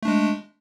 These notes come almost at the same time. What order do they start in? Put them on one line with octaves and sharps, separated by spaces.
A3 D4 G#3